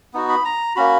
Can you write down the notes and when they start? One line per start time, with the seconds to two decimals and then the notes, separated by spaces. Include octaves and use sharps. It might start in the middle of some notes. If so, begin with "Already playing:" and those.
0.14 B3 D#4 F#4
0.29 B5
0.45 A#5
0.76 A#3 C#4 F#4 B5